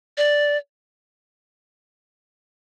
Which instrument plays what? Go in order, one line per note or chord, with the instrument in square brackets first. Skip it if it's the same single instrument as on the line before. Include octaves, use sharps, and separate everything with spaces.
[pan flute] D5